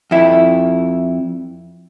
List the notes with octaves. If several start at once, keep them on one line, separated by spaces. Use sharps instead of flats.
F2 E4